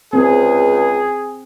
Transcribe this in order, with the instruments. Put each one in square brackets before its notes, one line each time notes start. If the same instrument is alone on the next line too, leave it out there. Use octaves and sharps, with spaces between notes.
[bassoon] C#2 [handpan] C4 [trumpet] G#4